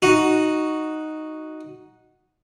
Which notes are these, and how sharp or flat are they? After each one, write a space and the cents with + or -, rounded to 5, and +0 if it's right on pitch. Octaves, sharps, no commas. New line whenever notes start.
D#4 +0 F#4 +0